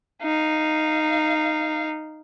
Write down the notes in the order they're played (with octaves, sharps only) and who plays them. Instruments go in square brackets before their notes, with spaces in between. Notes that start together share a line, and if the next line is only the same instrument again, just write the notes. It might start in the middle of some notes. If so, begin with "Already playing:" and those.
[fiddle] D#4 F5